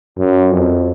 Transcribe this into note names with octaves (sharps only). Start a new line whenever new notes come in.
F#2
F2